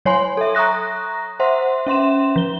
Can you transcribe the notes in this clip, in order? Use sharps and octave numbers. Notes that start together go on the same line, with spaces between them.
F#3 C#5 G#5 C6
A4 E5
A#5 C#6 D#6 F#6 A#6
C5 E5 F#5 C6
C#4 E5 C6 E7
F3 G7